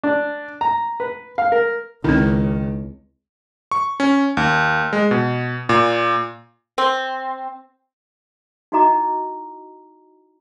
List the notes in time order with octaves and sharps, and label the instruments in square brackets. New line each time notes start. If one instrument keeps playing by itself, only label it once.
[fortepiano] D4
A#5
B4
F5
A#4
[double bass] C#2 [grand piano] D#3 [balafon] C4 E4
[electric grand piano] C#6
C#4
D#2
G#3
B2
A#2
[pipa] C4
[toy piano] D#4 E4 F#4 D#5 A#5 D6